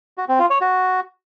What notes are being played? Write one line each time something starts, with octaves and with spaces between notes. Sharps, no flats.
F#4
C4
F4
C#5
F#4